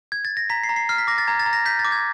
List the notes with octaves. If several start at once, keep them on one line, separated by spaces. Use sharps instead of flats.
G#6
A6
A#6
A#5 B6
C7
A#5
C7
F6 C7
B6
D6 A#6
A6
A#5 G#6
A6
A#5
A#6
G6 B6
A6
D6
G#6